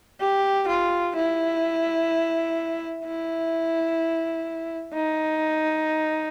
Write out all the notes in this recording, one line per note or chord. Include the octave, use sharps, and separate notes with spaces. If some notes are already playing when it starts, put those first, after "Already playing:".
G4
F4
E4
E4
D#4